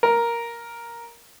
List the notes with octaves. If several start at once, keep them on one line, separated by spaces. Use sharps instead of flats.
A#4